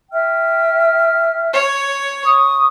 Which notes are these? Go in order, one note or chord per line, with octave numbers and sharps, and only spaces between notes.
E5 G5 F6
C#5
C#6 D#6